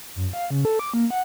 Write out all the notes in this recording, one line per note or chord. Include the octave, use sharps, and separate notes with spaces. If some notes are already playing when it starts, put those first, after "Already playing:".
F#2
F5
C#3
A4
D6
A#3
F#5